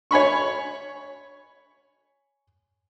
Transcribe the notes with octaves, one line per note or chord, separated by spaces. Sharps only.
C#5 G#5 B5 C#6